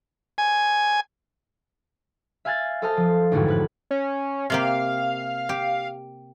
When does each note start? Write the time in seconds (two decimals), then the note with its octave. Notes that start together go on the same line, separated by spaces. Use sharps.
0.38 G#5
2.45 E5 F5 G#5 F#6 A6
2.82 A4 C5 D#5 F5 A5
2.97 F3
3.32 A1 F2 G#2 D3 E3 F#4
3.48 B4 F#6
3.91 C#4
4.50 C3 A#3 G4 F5
5.49 G4